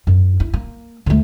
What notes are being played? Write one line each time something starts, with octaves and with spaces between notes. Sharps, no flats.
F#2
E4
A#3
D2 A3